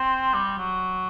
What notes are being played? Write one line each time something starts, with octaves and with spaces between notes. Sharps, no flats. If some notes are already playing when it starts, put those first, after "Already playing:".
Already playing: C4
G3
F#3